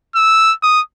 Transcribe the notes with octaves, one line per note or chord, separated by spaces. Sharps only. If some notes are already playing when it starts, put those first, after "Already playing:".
E6
D#6